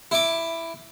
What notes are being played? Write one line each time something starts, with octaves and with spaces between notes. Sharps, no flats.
E4 D6